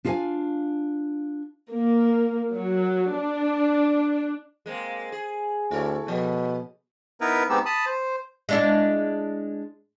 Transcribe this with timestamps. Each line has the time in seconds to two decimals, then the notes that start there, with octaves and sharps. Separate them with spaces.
0.05 D4 F4 F#4 D#5 F5 G#5
1.71 A#3
2.54 F#3
3.15 D4
4.66 G#3 A#3 C4
5.12 G#4
5.71 D2 E4 A4 C#5
6.08 B2 F3
7.21 B3 D#4 E4 A#4 B4
7.49 G#3 B3 C4 D#4 G4 E6
7.66 A5 B5 D#6
7.86 C5
8.49 G#3 D4 E4